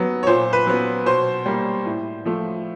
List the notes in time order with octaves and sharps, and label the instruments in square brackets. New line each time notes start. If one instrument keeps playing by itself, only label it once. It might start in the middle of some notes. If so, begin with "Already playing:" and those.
Already playing: [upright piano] F#3 B3
C#5
A#2 C5
B4
F#3 B3
B2 C5
G3 A#3
A2
F3 A3